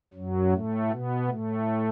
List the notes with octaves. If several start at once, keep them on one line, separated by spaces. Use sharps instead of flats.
F#2 F#3
A2 A3
B2 B3
A2 A3